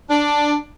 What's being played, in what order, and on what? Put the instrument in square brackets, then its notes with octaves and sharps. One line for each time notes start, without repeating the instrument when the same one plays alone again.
[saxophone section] D4